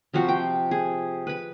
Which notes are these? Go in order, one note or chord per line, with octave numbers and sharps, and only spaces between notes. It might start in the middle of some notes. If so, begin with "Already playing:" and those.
C3 F3 C4 F#4
G5
G#4
B4 B5